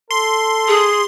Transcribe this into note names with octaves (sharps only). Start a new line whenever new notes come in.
A4 C6
G#4